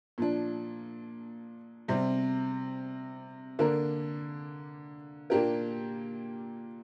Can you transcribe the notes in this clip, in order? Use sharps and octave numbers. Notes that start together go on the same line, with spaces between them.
A#2 F3 D4
C3 G3 C4
D3 A#3 D4 A#4
A#2 A#3 D4 G4 A#4